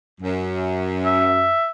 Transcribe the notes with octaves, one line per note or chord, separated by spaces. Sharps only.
F#2
E5